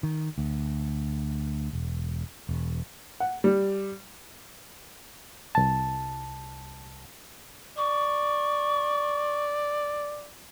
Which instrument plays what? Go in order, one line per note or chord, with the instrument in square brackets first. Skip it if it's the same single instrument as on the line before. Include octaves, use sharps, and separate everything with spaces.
[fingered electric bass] D#3
D2
E1
E1
[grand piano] F#5
G3
[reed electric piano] C2 A5
[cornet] D5 [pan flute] C#6